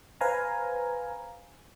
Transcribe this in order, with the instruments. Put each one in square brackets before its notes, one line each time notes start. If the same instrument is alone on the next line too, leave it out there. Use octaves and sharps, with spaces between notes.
[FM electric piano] B4 C5 F5 G#5 A#5